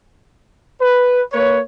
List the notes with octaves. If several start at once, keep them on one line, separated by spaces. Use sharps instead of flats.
B4
A#3 B4 C#5